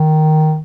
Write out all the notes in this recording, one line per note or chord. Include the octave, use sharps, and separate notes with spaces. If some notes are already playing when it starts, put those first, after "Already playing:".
Already playing: D#3